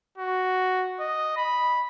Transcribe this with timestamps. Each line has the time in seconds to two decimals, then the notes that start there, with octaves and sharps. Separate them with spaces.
0.18 F#4
1.00 D#5
1.37 B5